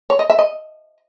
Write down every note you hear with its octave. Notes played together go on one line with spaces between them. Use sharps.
C#5
D#5
E5
D#5